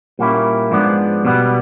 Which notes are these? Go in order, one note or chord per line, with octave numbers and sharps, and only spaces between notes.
A#2 G3 A#3 C#4 E4
G#2 F3 G#3 B3 D4
B2 G3 B3